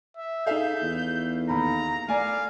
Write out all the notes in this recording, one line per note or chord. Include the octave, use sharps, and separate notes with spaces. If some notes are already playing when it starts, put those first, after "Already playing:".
E5
D#4 G#4 A4 E5 F5 G6
E2
D#2 A#5 B5
A3 D5 F5 G#5